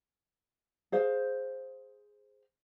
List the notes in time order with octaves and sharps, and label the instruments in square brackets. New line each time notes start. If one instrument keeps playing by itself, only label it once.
[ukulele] G#4 C5 F5